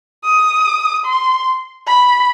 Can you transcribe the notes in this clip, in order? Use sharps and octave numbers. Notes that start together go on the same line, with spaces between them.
D#6
C6
B5